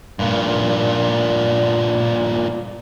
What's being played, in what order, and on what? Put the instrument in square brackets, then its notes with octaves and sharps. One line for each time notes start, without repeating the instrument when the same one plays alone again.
[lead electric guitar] G2 A#2